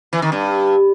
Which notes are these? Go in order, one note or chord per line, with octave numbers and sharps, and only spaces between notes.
E3
D#3
G2